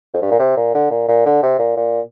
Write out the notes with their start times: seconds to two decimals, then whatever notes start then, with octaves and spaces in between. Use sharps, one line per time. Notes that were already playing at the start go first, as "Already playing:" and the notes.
0.14 F2
0.22 G2
0.31 A#2
0.39 C3
0.57 A#2
0.74 D3
0.90 A#2
1.08 A#2
1.26 D3
1.43 C3
1.59 A#2
1.77 A#2